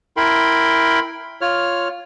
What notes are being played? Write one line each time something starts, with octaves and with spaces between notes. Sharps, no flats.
E4 A#4 G5 B5 C6
F4 C#5 F6